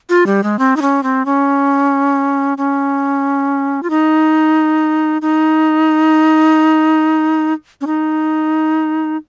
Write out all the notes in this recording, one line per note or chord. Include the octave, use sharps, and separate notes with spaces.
F4
G3
G#3
C4
D#4
C#4
C4
C#4
C#4
F4
D#4
D#4
C#4
D#4